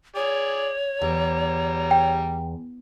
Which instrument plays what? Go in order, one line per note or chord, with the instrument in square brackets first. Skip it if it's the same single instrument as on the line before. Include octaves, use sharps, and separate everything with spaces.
[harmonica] G#4 D5 [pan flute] C#5
[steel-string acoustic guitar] E2 [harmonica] G3 A#5
[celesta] G5